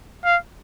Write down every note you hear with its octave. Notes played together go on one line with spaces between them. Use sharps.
F5